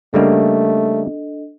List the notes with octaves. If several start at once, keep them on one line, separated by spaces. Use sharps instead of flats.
C#3 G3 A3 A#3 D4 A4 D#5